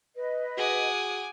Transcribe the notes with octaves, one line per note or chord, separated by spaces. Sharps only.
B4 D#5
F#4 G#4 F#5 G#5 D6 D#6